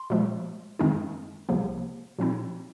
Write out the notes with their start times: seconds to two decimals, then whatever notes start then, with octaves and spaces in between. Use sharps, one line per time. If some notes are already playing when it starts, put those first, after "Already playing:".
Already playing: C6
0.10 A#2 F3 G#3
0.79 F#2 D#3 G#3 C4 D#4
1.49 C2 C3 F3 A#3
2.19 A#2 F3 C4 D#4